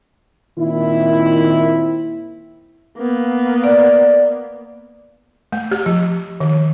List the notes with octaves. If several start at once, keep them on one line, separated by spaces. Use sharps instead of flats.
A#2 D#3 C4 E4
A#3 B3
D5
A3
G4
F3
D#3